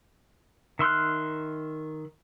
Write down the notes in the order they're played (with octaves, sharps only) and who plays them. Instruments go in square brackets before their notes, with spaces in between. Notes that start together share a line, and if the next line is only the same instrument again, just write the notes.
[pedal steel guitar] D#3 E5 C6 F6 F#6